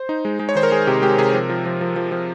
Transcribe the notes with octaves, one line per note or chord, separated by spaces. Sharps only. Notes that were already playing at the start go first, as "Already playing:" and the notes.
Already playing: C5
D#4
G#3
G#3
C#5
D#3 C5
A#4
G#3 G#4
C3 G4
G#3 G4
C3 G#4
F3 A#4
F3
F3
F3
F3
F3